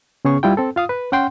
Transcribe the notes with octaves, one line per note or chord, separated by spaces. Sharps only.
C#3 B3 C#4 G#4 C#6
G3 E4 F4 G5
C4 A4
F4 F5 D#6
B4
C#4 F#5 G5 C6